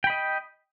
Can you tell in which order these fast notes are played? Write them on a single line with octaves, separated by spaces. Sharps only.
G5 B5 D#5